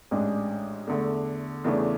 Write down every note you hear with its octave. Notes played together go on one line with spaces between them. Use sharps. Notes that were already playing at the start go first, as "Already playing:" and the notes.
A1 G#2 G#3 D4
E2 D3 A3
E2 C#3 E3 A3 D4